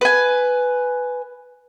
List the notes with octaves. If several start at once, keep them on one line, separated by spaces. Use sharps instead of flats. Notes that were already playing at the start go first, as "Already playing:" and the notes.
B4 G#5